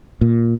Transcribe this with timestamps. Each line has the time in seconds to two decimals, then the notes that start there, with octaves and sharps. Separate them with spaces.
0.21 A#2